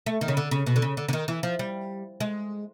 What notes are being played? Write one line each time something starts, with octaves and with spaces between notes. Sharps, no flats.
A3
D#3
C#3
D3
C#3
B2
D3
C#3
D3
D3
D#3
E3
F3
G3
G#3